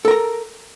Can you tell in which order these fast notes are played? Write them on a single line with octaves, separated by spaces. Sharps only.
A4 A#4 A#5